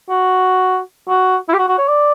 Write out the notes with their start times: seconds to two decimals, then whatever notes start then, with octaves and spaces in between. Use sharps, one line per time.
0.10 F#4
1.09 F#4
1.49 E4
1.53 G4
1.58 F#4
1.69 F#4
1.78 C#5
1.88 D5